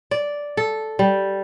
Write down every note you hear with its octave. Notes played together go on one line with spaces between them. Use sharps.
D5
A4
G3